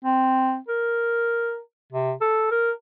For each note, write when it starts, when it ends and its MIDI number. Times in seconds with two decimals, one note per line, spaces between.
0.05 0.57 60
0.68 1.59 70
1.92 2.12 48
2.21 2.46 69
2.51 2.71 70